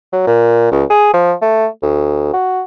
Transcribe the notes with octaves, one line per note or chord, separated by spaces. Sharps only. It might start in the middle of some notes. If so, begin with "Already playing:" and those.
F#3
A#2
C#2
G#4
F3
A3
D2
F#4